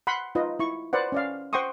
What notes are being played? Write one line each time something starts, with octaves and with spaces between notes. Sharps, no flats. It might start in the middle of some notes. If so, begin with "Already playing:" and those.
F#5 B5 C6
D#4 F4 B4 D#5
E4 C#6
B4 C5 D5 F#5
C#4 D5 F5
C5 F#5 G5 C6 C#6 D#6